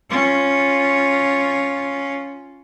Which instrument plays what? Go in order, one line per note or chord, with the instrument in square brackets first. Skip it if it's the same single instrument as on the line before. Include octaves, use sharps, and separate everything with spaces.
[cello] C#4 F4